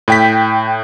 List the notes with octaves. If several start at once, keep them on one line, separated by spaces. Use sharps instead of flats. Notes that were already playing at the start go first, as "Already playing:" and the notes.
A2 G5 B6